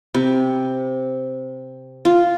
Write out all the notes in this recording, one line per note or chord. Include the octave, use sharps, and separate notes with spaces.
C3
F4